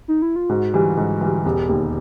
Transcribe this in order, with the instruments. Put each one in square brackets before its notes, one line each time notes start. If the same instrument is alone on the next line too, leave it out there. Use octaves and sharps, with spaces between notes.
[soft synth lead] D#4
E4
F4
[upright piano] G#2 [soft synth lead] F#4
[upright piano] E3 G3
G#2
E3 G3
[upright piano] E1 [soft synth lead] G4
[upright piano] D#2 D#3